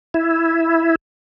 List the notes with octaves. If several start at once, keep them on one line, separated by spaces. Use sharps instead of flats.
E4